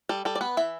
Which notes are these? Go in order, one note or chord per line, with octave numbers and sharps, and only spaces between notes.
G3 A4
G3 A4
D5
B3 B4
E3 E5